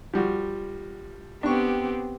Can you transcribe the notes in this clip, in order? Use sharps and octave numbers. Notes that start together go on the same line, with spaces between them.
F3 G3 F#4
B3 C4 D4 G4 C#6